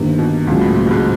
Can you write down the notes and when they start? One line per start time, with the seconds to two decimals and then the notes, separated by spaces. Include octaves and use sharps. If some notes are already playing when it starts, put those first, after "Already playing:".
Already playing: G1 G2 C3 D#3 G3 A#3
0.18 B2
0.47 C#2 A#2 C#3 F#3
0.61 A2
0.76 A#2
0.87 G2
0.91 G#2